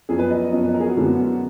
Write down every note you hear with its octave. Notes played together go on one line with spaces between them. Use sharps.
F#2 F3 B3 G#4
B4
D#5
D#5
F#2 F3 B3 D#5
B4
A#4
G#4
F#4
F#2 D3 G#3 B3 F#4